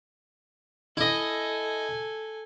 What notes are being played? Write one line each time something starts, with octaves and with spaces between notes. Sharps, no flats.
E4 A4 D#5 G#5